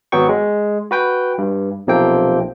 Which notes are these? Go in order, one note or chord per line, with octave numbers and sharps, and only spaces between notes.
G#1 F#3 B3 G5 C#6
G#3
F#4 B4 G5
G2
B1 C3 F3 A#3 C4 G5